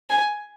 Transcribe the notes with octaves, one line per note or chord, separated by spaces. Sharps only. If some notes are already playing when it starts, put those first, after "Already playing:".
G#5